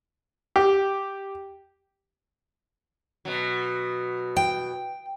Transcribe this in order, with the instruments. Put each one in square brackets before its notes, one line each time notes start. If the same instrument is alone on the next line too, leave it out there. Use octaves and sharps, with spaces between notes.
[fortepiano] G4
[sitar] B2 F#3
[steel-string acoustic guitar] G5